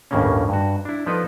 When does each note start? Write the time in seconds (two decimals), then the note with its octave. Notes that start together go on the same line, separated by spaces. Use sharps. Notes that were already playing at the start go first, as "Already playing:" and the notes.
0.11 G1 D#2 A2 C#3 A#3 C#4
0.49 G2 F#4
0.85 D4 E4
1.06 F3 B3 D#4 A4 B4 D5